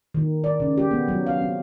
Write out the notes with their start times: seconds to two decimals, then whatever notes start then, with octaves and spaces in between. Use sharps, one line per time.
0.14 D#3
0.44 D5
0.60 C#3
0.78 G4
0.91 B3
1.08 F#3
1.26 F5
1.42 C4